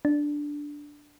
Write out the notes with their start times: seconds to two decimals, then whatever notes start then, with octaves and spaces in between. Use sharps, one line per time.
0.05 D4